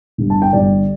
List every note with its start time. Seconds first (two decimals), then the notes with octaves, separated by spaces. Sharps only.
0.18 G1 G2 D3 G3
0.30 A5
0.42 G5
0.53 G1 G2 D3 G3 D5